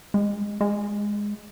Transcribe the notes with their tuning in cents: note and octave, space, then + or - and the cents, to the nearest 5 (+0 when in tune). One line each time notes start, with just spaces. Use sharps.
G#3 -15
G#3 -5